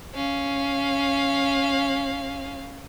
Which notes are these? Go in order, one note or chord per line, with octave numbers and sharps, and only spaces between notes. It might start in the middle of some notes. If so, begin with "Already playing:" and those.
C#4 F5